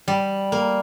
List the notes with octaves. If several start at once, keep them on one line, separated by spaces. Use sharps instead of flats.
G3
A#3